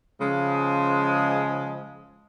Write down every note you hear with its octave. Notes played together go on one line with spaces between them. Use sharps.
C#3 F3 G#3